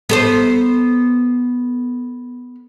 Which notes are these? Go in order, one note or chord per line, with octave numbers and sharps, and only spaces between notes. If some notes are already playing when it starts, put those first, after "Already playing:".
B3 A4 C5